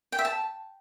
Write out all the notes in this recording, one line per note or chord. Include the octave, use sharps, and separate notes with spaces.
G5
E5
A5